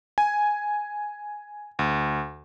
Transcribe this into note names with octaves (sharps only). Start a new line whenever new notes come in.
G#5
D2